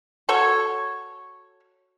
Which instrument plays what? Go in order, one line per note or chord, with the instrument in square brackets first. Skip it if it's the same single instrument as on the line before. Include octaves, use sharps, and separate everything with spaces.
[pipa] F#4 A4 C#5